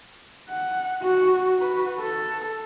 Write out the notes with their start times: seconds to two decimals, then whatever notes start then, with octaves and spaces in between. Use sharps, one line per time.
0.49 F#5
1.03 F#4
1.57 F#4 B4
2.00 A4